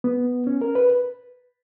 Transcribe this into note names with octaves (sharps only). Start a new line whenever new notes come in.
B3
C#4
A#4
B4